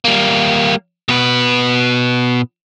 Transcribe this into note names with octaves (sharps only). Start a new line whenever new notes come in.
G3 A#3
B2 B4